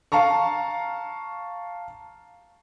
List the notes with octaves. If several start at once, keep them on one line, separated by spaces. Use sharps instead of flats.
F5 A5 A#5 C#6